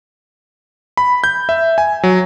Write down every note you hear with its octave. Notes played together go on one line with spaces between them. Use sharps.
B5
G6
E5
G#5
F#3